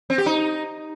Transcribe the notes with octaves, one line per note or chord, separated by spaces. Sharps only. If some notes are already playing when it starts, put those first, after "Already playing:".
C4
G4
D#4